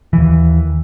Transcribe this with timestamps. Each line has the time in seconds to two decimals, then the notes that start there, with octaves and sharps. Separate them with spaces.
0.13 D#2 E3